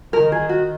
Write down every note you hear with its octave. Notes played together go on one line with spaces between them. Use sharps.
D#3 A#4
G#4
F#4